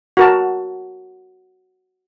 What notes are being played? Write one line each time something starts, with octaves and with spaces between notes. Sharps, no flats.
F#4 A#4 A5